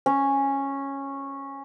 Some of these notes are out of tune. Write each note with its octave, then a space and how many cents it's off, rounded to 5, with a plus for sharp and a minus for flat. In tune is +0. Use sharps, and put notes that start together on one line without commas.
C#4 -10